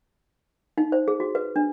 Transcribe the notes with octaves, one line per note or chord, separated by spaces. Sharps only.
D#4
C5
G#4
F#4
B4
D4